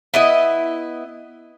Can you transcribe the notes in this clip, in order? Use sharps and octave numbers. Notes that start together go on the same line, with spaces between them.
B3 E4 D#5